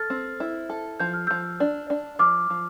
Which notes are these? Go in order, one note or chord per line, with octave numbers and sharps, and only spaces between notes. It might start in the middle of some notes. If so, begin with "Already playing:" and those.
Already playing: A4 F6 A6
C4
E4
A4
F3 G6
F6
F3 E6 G6
D4
D4
F3 D6 F6
F3